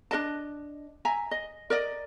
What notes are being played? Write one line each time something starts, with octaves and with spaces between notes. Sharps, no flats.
D4 A#4 D#5 A5
E5 G#5 A#5
D#5
A#4 D5 D#5